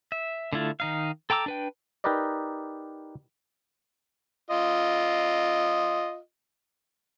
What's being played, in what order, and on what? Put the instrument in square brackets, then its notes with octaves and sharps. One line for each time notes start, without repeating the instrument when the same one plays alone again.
[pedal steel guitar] E5
D3 A3 E4 F4
D#3 D#4 F5
A4 G5 A#5 D6 E6
D4 B4 G5
[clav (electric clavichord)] D#4 G4 A#4 B4 D5 D#5
[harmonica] F4 D#5